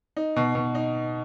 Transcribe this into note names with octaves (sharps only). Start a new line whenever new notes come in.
D#4
B2
B2
D#4